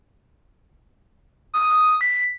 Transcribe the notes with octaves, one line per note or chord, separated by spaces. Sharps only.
D#6
D#6
B6